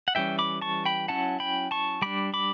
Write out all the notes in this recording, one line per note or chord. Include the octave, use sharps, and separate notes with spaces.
F#5
E3 G3 C#4 E5 G5
B5 D6
A5 C#6
G5 B5
F#3 C#4 E4 F#5 A5
G5 B5
A5 C#6
G3 D4 B5 D6
B5 D6